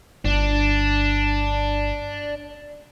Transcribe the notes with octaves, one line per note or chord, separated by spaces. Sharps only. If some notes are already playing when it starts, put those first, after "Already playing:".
G1 D4